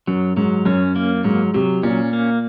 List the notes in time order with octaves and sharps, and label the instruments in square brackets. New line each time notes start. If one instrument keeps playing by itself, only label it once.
[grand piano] F#2 [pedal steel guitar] F#3
[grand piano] G#2 [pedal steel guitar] F#3
[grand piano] F#2 [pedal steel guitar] C#4
[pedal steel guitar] A#3
[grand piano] G#2 [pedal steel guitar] F#3
[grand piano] C3 [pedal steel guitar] F#3
[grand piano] A#2 [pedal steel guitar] C#4
[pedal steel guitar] A#3